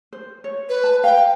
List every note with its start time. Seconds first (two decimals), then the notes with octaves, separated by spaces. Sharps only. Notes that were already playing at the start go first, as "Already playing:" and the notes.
0.13 C5
0.44 C#5
0.69 B4
0.84 A5
1.04 F5 G5